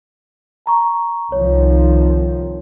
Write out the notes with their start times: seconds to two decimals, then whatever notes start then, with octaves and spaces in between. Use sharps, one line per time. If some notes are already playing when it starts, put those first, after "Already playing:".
0.66 A5 A#5 C#6
1.32 C2 D#3 F3 C#5